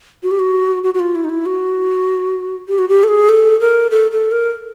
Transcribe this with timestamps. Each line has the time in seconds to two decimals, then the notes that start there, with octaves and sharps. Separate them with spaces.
0.23 F#4
0.31 G4
0.39 F#4
0.84 F#4
0.94 F#4
1.00 F4
1.15 E4
1.24 D#4
1.30 E4
1.46 F#4
2.68 G4
2.79 F#4
2.89 G4
3.04 A4
3.08 G#4
3.29 A4
3.60 A#4
3.91 A4
4.11 A4
4.32 A#4